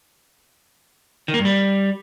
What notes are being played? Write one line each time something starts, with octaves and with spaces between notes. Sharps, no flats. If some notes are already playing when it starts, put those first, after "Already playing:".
D#3
A#3
G2
G3